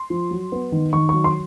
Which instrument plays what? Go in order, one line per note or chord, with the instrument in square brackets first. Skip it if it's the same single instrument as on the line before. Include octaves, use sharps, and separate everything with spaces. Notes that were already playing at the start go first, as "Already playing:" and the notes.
Already playing: [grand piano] C6
F3
F#3
B3
D#3
D#3 C#6
F#3 C#6
C6